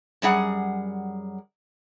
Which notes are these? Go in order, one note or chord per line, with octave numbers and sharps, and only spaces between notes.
F#2 G3 G#4 F#5